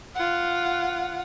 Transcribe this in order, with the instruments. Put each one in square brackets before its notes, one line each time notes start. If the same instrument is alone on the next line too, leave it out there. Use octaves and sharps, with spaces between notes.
[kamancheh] F4 F#5